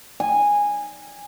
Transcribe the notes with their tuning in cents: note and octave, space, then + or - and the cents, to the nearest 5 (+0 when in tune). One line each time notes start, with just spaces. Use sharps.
G#5 -15